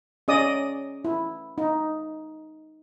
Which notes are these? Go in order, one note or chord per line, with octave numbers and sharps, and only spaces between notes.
C#4 G#4 D5 D#5 D#6
E4
D#4